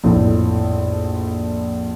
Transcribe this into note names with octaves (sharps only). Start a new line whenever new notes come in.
A#1 F2 A2